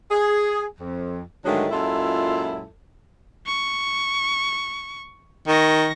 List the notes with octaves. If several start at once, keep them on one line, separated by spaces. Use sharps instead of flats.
G#4
F2
G#2 D3 D#3 F#3 G#3 A3
F#2 A#2 G#3 E4 F4 A4
C#6
D#3 C#6 A#6